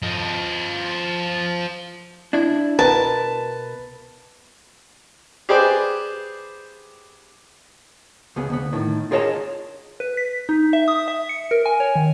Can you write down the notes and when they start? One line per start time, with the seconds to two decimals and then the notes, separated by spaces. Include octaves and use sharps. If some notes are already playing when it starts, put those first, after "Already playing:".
0.02 F3 D#5
2.33 D4 E4
2.79 B2 A#4 B4 A5
5.49 G4 G#4 B4 C5 D5
8.36 C#2 B3 G#4
8.50 D2 B3
8.73 A2 D#3
9.11 F4 G#4 A#4 C#5 D#5 A5
10.00 B4
10.17 B6
10.49 D#4
10.73 E5
10.88 D#6
11.08 E5
11.29 C#7
11.51 A#4
11.66 G#5
11.80 C#5
11.96 D#3